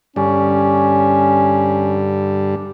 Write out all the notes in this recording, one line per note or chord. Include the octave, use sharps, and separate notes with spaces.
G2 D3 G3 C#4